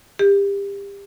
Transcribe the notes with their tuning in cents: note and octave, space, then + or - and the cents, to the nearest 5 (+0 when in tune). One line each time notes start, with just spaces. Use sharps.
G4 +30